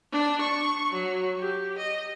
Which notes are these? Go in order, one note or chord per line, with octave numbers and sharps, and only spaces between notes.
D4
C#6
F#3
G4
D#5